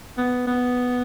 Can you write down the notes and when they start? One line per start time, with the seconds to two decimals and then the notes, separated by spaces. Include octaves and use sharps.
0.17 B3
0.47 B3